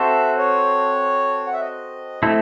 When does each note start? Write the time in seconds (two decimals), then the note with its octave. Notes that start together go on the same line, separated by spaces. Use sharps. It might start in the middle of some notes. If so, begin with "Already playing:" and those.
Already playing: C4 F#4 A4 C5 E5
0.37 C#5
1.47 F#5
1.53 E5
1.61 D#5
2.23 A3 C4 E4 A4